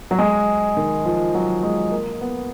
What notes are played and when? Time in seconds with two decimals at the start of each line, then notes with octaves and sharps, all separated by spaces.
0.11 F#3
0.19 G#3
0.77 D#3
1.06 F3
1.35 F#3
1.63 G#3
1.91 A#3
2.21 B3